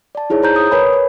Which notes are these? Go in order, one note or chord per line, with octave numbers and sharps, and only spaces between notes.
D5 A5
D#4 E4 G#4 C#5
C5 A#5 G6
D#6
A#4 B4 C#5 G#5 B5
C#5